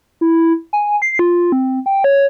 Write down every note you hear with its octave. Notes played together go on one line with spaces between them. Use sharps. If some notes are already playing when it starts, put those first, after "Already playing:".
E4
G#5
C7
F4
C4
G5
C#5